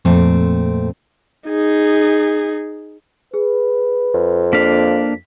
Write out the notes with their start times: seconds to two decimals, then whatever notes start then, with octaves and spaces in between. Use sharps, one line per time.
0.05 F2 A#2 A3 C4
1.48 D#4 G#4
3.34 G#4 B4
4.14 F2
4.53 A#3 D4 F5 B6